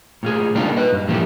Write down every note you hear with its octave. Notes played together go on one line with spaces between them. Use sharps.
A2 F4 G#4
G3 A#3 D4 D#4 F4
B4 D#5
G2
E3 F3 A3 A#3 E4 G4